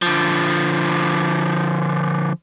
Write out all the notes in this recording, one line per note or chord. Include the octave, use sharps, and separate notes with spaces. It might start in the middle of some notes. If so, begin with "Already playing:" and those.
D3 F3